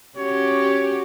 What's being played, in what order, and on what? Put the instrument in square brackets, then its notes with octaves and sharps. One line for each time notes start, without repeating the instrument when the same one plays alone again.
[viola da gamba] C#4 F#4 G4 [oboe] C#5